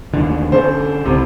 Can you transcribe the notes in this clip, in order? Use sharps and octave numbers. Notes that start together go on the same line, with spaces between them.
D#2 D3
D3 C#4 A4 C5
C2 C3